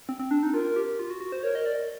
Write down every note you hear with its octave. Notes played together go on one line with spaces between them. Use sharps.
C4
C4
D4
D#4
F4 A#4
G4
F4
F#4
F#4
C5
A#4 C#5
D#5
D5